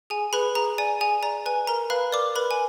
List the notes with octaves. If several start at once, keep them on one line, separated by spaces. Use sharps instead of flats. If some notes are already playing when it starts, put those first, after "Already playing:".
G#4 G#5
G#4 B4 B5
G#4 A#5
D5 G#5
G#4 G#5
D5 A#5
B4 G#5
A#4 A#5
B4 F5 B5
A#4 D5 D6
A#4 B4 B5
G#5